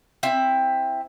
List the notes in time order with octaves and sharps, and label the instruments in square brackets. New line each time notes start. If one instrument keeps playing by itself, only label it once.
[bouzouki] C4 E4 E5